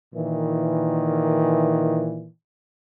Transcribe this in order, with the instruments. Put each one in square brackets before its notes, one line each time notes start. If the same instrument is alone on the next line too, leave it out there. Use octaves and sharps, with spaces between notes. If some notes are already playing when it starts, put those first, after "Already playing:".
[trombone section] A#2 D#3 E3